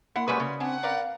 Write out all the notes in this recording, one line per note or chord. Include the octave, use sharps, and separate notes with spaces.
A#3 E4 F#5 C6
G3 G#3 C#4 F#4 B4
C#3
C4 D4 F#5 G#5
A#4 B4 D5 F5